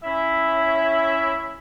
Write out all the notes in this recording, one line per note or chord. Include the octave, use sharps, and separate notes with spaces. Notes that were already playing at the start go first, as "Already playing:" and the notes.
C#4 E4 E5